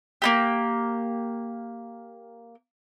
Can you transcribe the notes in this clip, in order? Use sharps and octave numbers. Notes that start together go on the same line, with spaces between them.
A#3 D#4 G4